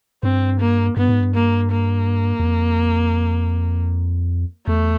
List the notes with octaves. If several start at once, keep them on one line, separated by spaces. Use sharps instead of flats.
G2 C4
A#3
G2 B3
G#2
G2
A#3
A#3
E2
F2
E2 A3